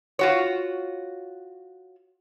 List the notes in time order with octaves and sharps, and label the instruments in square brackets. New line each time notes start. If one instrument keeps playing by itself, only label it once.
[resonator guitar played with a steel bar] F4 F#4 C#5